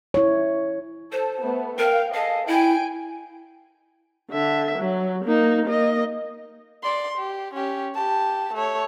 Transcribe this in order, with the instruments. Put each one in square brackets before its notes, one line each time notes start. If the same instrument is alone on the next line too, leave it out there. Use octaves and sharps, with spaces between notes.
[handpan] E4 C#5
[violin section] A4 [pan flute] C5
[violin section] A3 B3
[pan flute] A#4 [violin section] F5 G5
[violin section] G#4 A4 D#5 [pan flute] F5
[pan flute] E4 [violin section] G5 G#5 D7
[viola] D3 E5
F#3
A#3 D#4
A#3 D#5
[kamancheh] D5 C6
G4
C#4 G4
G4 A5
A3 C#5